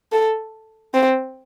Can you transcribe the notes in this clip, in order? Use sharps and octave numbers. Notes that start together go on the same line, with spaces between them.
A4
C4